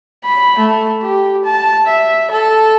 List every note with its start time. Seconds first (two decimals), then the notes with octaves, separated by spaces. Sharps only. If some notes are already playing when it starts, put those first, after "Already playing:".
0.25 B5
0.58 A3
1.03 G4
1.44 A5
1.86 E5
2.31 A4